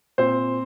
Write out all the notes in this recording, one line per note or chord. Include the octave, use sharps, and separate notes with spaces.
A#2 C4 C5